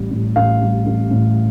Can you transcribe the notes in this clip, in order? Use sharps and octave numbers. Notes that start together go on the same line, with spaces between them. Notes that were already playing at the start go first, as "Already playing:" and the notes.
Already playing: A1 G3
A2
A1 F5
G3
A1
A2